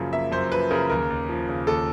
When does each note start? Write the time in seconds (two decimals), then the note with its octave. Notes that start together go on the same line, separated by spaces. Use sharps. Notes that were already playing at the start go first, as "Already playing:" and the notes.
Already playing: F#2 C#3 F3 A#3
0.13 A#3 E5
0.32 F#2 C5
0.51 F3 B4
0.71 C#3 A#4
0.90 D#2 A#4
1.10 D#2
1.29 F3
1.49 C#3
1.67 D#2 A4